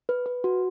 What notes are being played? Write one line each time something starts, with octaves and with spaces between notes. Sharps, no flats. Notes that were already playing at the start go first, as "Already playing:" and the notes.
B4
B4
F#4